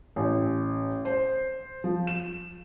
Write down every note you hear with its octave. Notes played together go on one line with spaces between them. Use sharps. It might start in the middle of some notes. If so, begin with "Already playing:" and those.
A1
C5
F3
E7